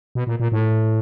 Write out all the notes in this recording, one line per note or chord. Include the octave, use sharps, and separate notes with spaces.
B2
A#2
A#2
A2